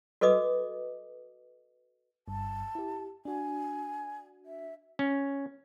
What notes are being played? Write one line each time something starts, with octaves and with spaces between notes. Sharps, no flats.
F#4 A4 B4 D#5 D6 D#6
G1 G2 A5
E4 G4
D4 F#4 G#5
E5
C#4